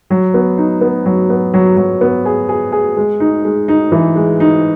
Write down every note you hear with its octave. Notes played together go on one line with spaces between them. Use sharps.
F#3
B3
D#4
B3
F#3
B3
F#3
F#3
B3
G#4
G#4
G#4
G#3
D#4
G#3
D#4
E3
G#3
D#4